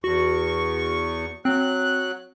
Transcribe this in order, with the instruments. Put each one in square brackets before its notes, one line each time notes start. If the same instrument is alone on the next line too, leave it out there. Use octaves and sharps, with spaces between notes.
[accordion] E2 C#6 [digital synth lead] F#4
[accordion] F#3 F#6 [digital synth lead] C4